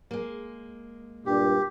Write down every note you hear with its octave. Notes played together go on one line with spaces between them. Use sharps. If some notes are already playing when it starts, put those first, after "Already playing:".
G#3 A#3
G2 A#2 G4